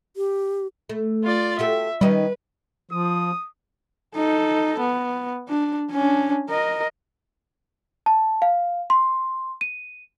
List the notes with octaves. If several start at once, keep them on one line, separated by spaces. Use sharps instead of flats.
G4
A3
F4 D5
F#4 G4 A4 E5
D#3 G3 C#4 D#4 B4
F3 D#6
D#4 A4
B3
D4
C#4 D4
A#4 D#5
A5
F5
C6
D#7